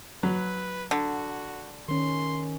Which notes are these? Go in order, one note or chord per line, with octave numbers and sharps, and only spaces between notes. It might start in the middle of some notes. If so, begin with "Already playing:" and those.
F#3 B4
D3 F#4
D#3 C#4 C6